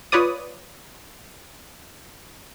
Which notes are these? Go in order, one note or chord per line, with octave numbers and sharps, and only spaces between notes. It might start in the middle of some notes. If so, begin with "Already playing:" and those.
F4 B4 C#5 D5 D#6